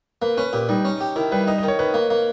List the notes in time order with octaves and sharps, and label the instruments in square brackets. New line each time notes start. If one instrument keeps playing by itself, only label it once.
[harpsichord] A#3 [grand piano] B4
[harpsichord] C#4 [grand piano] B4
[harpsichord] A#2 [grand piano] G4
[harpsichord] G3 [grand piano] D#4
[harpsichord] C#4
G4
[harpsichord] D#3 [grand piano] E4
[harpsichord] G3 [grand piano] B4
[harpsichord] D#4 [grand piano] D#5
[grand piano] D#5
[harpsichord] D#3 [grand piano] C#5
[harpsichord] D#3 [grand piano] B4
[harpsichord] A#3
A#3